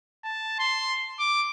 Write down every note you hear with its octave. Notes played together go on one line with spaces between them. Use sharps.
A5
C6
D6